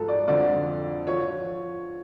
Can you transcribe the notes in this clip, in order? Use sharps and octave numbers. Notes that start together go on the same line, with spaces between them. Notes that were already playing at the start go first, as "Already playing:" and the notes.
Already playing: G#2 F3 A4
D5
F2 D3 F3 D5
F3 C#5